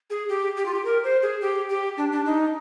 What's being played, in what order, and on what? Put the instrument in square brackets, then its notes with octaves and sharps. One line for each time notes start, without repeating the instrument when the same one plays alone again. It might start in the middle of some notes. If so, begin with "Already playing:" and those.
[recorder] G#4
G4
G4
F4
G4
A#4
C5
G#4
G4
G4
D4
D4
D#4